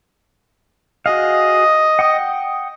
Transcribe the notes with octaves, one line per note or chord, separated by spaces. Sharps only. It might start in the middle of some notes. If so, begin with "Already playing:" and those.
F#4 G#4 D#5 F5
F#5 G5 D#6